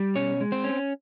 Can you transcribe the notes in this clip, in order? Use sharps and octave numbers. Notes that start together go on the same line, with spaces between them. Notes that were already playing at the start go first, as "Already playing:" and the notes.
Already playing: G3
B2 C#4 C#5
G#3
C4 C5
C#4